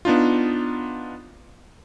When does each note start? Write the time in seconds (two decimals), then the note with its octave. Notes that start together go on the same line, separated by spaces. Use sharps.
0.05 B3 D4 D#4 F4